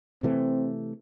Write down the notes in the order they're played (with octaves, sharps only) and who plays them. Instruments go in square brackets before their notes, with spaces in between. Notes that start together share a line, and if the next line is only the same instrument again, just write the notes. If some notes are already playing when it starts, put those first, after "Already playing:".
[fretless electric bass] C3 E3 A3 [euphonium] C4